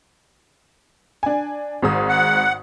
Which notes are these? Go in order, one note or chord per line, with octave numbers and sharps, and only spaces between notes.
D4 G#5
G#1 G#2 D#6
F#5